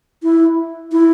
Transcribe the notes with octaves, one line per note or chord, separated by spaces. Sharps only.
E4
E4